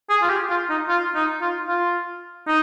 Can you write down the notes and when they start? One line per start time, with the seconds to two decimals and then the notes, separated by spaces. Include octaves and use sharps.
0.10 G#4
0.22 F4
0.29 G4
0.50 F4
0.70 D#4
0.89 F4
1.15 D#4
1.41 F4
1.68 F4
2.47 D#4